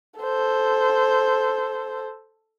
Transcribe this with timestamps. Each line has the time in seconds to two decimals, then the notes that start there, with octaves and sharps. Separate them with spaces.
0.20 A4 C5